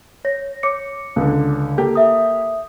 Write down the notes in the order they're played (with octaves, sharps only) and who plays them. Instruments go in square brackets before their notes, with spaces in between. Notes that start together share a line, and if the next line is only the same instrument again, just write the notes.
[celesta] C#5 A#6
C#5 D6 C#7
[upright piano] C#2 D3
A#3 G4 A4
[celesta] E5 D#6